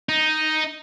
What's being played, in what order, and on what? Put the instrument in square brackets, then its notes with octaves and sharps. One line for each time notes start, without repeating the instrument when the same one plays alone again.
[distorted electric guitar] D#4